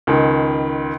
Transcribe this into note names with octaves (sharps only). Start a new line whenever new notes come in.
C#2 D#3